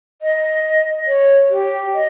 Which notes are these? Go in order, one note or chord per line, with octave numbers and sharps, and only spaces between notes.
D#5
C#5
G4
D#5